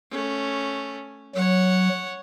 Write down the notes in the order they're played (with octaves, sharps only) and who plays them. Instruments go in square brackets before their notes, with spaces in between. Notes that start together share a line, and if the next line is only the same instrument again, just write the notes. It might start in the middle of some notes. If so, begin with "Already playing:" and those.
[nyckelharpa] A3 C#4
[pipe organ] F#3 [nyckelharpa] C#5 F#5